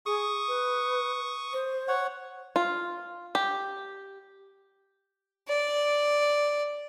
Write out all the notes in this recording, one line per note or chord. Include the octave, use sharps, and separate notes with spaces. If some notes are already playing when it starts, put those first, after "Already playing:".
G#4 C#6 D#6
B4
C5
C#5 F#5
F4
G4
D5